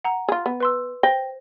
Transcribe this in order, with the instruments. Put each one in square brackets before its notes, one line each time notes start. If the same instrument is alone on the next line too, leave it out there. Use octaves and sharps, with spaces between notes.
[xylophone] F#5 A#5
[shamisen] F4 G#4
B3
[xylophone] B4 C6 E6
[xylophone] C5 A#6 G7 [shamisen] G5